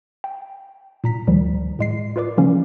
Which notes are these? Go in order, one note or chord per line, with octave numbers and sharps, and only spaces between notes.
G5
A#2 A#5 B6
D2 D#3 F3 G3
A2 G#3 C7
F4 A#4 B4 D5 D6
C#3 E3 F3 A#3 C#4